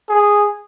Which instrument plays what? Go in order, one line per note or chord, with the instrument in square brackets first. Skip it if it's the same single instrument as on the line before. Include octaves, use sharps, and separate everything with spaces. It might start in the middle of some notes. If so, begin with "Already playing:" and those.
[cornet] G#4